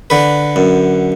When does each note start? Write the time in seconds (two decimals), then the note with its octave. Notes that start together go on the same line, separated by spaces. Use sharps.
0.10 D3 B4
0.56 F#2